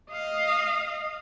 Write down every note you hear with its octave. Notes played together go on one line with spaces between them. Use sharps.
D#5 F5